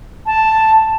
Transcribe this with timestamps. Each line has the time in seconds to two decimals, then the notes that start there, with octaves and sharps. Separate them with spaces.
0.26 A5